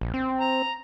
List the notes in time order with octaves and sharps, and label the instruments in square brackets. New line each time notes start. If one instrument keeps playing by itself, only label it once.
[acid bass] A#1
C4
[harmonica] A#5